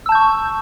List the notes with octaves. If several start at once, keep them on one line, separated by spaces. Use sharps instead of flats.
A5 C#6 E6 G6